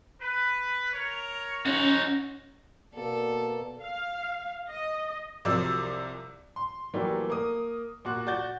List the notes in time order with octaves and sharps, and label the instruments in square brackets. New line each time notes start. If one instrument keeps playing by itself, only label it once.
[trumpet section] B4
A#4 C#5
[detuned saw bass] C#4 [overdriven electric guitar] D#4 F#4
[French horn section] B2 A#3 [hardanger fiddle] A4 D5
[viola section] F5
D#5
[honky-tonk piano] C2 C3 F3 F#3 D5 E6
[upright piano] C6
E3 F#3 G3 A3 A#3
A#3 D#6
A#2 F#4 F#6
F#4 D5 G6 A6